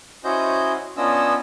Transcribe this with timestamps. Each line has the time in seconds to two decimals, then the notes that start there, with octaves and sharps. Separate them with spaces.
0.24 C#4 E4 F#4 C5 D#5 G6
0.97 B3 C#4 D4 F4 D#5 E6